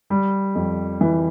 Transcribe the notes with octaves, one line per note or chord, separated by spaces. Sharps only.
G3
F2
E3